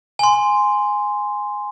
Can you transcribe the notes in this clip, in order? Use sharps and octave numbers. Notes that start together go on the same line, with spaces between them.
G#5 C6